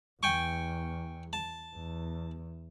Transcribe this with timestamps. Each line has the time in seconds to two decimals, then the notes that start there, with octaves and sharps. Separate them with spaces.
0.23 E2 G5 G#5 C#6
1.33 A5
1.75 E2